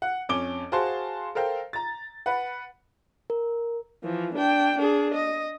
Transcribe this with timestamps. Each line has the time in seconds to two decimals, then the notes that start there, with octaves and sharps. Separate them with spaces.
0.02 F#5
0.29 F2 C#4 D6 D7 G7
0.72 F#4 G#4 C5 F5 A5 C6
1.35 A4 A#4 C5 F5 G5
1.73 A#5 A6
2.26 B4 F#5
3.30 A#4
4.04 E3 F3
4.35 D4 G5
4.78 D4 G#4
5.14 D#5